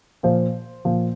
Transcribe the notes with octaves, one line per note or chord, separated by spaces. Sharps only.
A#2 F3 C5
A#2 F3